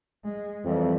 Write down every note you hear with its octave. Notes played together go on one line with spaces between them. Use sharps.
G#3
F2 E3 G3